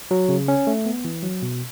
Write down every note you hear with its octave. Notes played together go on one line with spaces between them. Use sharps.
F#3
C#3
C#4
A3
B3
E3
F#3
B2